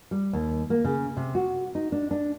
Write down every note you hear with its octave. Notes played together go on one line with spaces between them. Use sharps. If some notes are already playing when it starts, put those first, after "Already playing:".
G3
D#2
A#3
C#3
C3
F#4
D#4
D4
D4